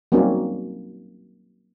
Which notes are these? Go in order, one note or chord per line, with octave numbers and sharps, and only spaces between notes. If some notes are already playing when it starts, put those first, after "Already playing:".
F#3 G3 A#3 C4 C#4 D#4